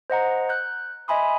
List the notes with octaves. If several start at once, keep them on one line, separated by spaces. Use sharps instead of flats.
C5 D#5 F#5 A#5
F#6 G6
D#5 E5 G#5 B5 C6 D#6